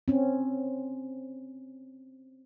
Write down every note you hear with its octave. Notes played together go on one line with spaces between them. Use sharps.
C4 C#4